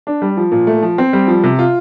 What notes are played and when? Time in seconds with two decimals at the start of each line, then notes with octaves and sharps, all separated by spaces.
0.07 D4
0.22 G3
0.37 F3
0.52 A#2
0.67 A3
0.82 F3
0.98 C4
1.13 G3
1.28 F3
1.44 C3
1.59 F4